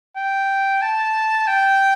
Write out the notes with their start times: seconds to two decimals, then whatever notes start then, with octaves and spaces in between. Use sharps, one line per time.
0.16 G5
0.82 A5
1.47 G5